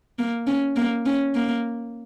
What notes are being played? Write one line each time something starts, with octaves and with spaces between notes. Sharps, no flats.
A#3
C#4
A#3
C#4
A#3